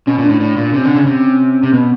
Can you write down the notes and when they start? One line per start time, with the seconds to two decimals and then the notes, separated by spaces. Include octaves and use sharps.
0.07 B2 C#4
0.18 A#2
0.24 D4
0.29 A2
0.40 A2 D4
0.57 A#2
0.74 C3 C#4
0.85 D3
0.96 C#3
1.06 C3
1.63 C3
1.73 B2 B3